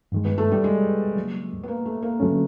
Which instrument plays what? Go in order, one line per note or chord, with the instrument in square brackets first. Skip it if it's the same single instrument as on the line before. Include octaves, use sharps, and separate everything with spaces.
[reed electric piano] G2 D#3 G#3
[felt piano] B3
A3
G3
G#3
[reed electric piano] C#3 F#3 A#3
[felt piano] B3
A#3
A3
A#3
[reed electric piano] D3 F#3 A3 C#4